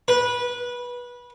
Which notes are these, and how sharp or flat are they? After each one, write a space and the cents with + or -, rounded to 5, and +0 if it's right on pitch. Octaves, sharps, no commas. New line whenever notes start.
B4 -20